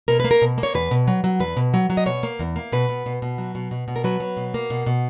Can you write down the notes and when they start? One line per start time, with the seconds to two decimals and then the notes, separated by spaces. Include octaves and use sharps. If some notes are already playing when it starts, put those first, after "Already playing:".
0.08 B2 A#4
0.20 A#3 B4
0.31 A#4
0.42 B2
0.58 A#3
0.63 C#5
0.74 E2 B4
0.91 B2
1.08 F#3
1.24 F#3
1.40 E2 B4
1.57 B2
1.74 F#3
1.90 F#3
1.97 D#5
2.06 B2 C#5
2.23 A#3
2.39 E2
2.56 A#3
2.72 B2 B4
2.89 B2
3.06 B2
3.22 B2
3.38 F#3
3.55 B2
3.71 B2
3.88 B2
3.96 A#4
4.04 F#3 B4
4.20 F#3
4.37 B2
4.54 A#3
4.70 B2
4.87 B2